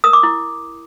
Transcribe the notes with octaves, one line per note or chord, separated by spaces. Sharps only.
A#4 D#6
D6
E4